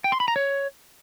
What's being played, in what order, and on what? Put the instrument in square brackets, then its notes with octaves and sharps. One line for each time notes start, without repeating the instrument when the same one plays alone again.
[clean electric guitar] G5
C6
B5
A#5
C#5